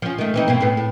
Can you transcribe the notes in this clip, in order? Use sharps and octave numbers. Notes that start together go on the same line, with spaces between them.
F3 C#4
D#3 A3
E3 C4 D#4
B2 A#3 C4
A2 B3
A2